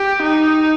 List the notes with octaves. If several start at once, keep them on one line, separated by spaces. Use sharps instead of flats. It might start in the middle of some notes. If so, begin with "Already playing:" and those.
Already playing: G4
D#4